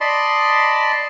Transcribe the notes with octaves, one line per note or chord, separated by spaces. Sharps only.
D5 D#5 A5 B5 C6